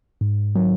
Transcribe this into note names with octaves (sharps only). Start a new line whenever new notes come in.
G#2
D#3 F#3